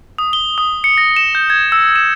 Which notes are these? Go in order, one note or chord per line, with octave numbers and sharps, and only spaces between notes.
D#6
G7
D#6
C#7
A#6
E7
G6
G#6
E6
E7